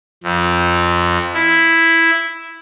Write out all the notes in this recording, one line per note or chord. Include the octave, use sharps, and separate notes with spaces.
F2
E4